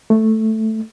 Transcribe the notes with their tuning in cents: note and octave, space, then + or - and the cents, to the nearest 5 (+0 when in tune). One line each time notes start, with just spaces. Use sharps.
A3 +0